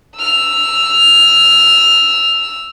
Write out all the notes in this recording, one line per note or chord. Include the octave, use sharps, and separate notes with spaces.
E6 F6